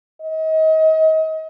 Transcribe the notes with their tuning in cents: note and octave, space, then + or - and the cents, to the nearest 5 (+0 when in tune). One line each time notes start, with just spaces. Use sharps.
D#5 +35